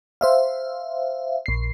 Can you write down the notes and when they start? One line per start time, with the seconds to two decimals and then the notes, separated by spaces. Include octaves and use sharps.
0.21 C5 E5 F5
1.46 A#1 C7